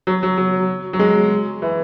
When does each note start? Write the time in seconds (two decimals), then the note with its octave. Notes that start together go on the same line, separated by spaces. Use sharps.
0.07 F#3
0.23 F#3
0.37 F#3
0.93 F#3
0.99 G#3
1.62 E3